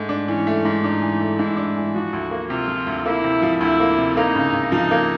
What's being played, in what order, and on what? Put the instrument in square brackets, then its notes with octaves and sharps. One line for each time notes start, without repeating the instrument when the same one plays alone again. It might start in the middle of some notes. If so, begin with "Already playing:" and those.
Already playing: [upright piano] G#2 A3
D4
[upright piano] E3 [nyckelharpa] C#4
[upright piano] A3
G#2
[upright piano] D4 [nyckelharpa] D#4
[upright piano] E3
A3
[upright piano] G#2 [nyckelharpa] E4
[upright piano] D4
E3
[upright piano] F3 [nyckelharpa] F#4
[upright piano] D2
A#3
[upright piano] C3 [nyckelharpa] F4
[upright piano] F3
D2
[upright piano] A#3 [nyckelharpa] E4
[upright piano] C3
F3
[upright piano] D2 [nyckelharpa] E4
[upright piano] A#3
C3
[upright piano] A#3 [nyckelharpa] D#4
[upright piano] C#3
C#3
[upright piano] F3 [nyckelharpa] D#4
[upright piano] A#3